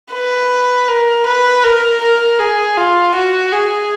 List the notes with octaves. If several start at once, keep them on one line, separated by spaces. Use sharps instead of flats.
B4
A#4
B4
A#4
A#4
G#4
F4
F#4
G#4